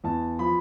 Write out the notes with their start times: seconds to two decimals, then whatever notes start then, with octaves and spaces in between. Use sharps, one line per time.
0.04 E2 A5
0.39 F3 B5